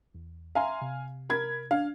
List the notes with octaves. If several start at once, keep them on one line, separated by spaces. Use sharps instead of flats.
E2
E5 F5 G#5 A#5 C6
C3
A#4 B5 G#6
D4 F5